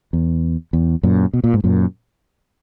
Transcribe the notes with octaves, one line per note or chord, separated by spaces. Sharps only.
E2
E2
F#2 A#2
B2
A#2
G#2
F#2 A#2